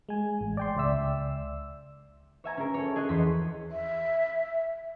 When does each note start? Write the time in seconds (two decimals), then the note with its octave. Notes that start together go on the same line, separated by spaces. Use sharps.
0.09 G#3 G#5
0.41 A1
0.57 D5 G5 C6
0.77 C#2 D5 E5 E6
2.44 C#5 E5 G#5 A#5
2.57 C#4 G#4 A#4
2.74 A4 C#5
2.96 G#4 D#5 C6 F#6
3.09 E2 C6 B6
3.70 E5